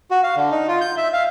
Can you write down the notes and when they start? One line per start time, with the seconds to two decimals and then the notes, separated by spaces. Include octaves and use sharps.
0.11 F#4
0.23 F5
0.36 D3
0.51 D#4
0.68 F4
0.81 G6
0.97 E5
1.13 F5